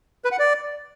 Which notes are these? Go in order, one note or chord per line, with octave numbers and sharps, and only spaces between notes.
B4
F#5
D5